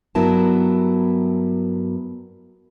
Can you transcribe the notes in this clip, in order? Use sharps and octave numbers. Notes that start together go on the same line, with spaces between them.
G2 F#3 B3 E4 A#4 A5